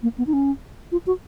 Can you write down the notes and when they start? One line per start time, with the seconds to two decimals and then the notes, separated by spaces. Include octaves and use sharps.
0.03 A#3
0.18 B3
0.27 D#4
0.33 C#4
0.92 F4
1.06 F#4